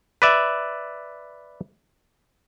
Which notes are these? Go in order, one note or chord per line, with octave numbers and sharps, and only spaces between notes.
B4 D5 E5